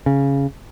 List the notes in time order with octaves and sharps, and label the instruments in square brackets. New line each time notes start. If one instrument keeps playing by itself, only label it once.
[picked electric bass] C#3